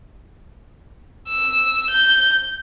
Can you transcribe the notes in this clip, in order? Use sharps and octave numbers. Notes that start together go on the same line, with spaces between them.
E6
G6